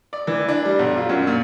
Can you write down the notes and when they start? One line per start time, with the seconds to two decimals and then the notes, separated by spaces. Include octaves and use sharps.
0.13 D5
0.27 E3
0.48 D4
0.65 G3
0.79 B1
0.97 F4
1.09 F#2
1.27 A#2